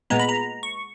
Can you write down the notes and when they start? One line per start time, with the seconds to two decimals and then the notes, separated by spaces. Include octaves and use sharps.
0.10 A#2 G#3 B3 A#5
0.19 B5
0.29 A#5
0.63 C#6